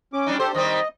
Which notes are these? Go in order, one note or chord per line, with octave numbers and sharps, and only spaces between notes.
C#4 D6
G3 D4 D#4
G4 A4 C5
D#3 G3 C4 D#5